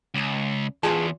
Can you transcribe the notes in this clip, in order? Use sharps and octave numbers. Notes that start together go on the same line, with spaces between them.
C#2
E2 F4 G#4 A5